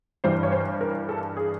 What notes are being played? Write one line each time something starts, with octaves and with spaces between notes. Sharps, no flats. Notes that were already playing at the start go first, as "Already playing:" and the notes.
G2 E3 G3 C5
C#5
C5
A#4
A4
G#4